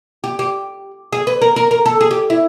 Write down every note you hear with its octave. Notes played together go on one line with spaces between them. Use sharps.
G4
G4
G#4
B4
A#4
A#4
A#4
A4
G#4
G4
E4